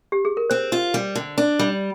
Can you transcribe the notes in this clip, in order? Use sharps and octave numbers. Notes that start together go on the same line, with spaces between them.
G4
G#4
A#4
C4 C5
F4
G3
D3
D4
G3